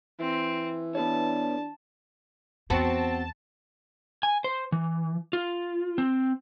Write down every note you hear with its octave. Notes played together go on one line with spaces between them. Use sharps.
E3 C4
B3 D4 G#4 C#5 A5
E2 B3 C4 F#4 A5
G#5
C5
E3
F4
C4